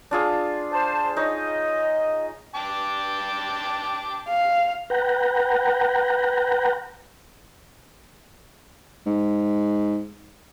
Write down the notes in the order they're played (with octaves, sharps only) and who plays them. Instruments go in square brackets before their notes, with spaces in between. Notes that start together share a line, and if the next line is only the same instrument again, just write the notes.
[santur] D4 F4 G#4
[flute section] C5 A5
[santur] D#4 C#5 [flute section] D#5
[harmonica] G5 A5 D6
[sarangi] F5
[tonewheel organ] B4 F#5 G5 A#5
[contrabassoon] G#2